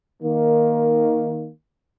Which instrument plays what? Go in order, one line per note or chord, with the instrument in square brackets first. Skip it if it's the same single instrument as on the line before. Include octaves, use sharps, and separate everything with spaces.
[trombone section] D#3 A#3